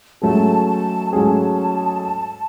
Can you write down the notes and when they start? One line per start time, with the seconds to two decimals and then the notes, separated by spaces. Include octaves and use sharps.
0.22 G#2 F#3 A3 C#4 G#4 A5
0.68 A5
1.13 G#2 F#3 A3 C#4 G#4 A5